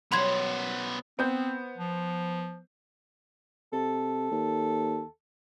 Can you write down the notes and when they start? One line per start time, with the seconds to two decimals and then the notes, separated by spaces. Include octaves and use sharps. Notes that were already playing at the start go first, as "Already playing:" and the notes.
0.12 B2 F#3 G3 B3 C5 B5 C6 G#6
1.19 B3 C4 C5 G6
1.78 F3
3.73 C3 A4
4.31 D#2